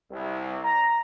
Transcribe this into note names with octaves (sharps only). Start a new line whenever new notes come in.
C2
A#5